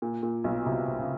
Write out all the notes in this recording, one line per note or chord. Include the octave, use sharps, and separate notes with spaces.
A#2
A#2
B1 B2
C2 C3
C3
C#3